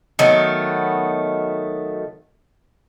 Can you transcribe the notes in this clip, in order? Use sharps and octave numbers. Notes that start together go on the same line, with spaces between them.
D#3 F#3 A3 B3